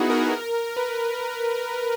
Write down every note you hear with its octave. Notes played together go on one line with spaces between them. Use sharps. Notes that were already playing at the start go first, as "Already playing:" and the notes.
Already playing: B3 D#4 E4 F#4 G#4
A#4
B4